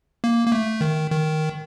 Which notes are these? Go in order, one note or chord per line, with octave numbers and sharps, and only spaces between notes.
A#3
A#3
A3
D#3
D#3